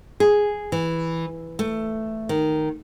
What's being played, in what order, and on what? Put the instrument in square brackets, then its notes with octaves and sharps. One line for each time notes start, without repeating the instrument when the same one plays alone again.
[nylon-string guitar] G#4
E3
A3
D#3